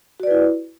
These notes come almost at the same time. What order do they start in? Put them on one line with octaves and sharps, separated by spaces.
F#4 D5 B4 E4